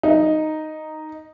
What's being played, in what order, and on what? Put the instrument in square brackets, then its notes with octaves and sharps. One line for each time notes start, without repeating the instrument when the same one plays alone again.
[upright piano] D#4